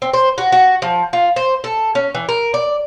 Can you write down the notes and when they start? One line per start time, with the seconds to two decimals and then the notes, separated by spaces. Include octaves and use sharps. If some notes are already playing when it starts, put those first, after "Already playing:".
0.02 C4
0.13 C5
0.38 F#4
0.52 F#4
0.82 F3
1.13 F4
1.36 C5
1.64 A4
1.95 C#4
2.15 E3
2.29 A#4
2.54 D5